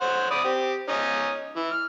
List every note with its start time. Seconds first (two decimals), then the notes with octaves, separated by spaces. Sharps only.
0.01 C5 C#5 F#5
0.31 D5 B5 D#6
0.44 C4 G4
0.88 C#4 D#4 D#5
1.56 E3
1.71 F6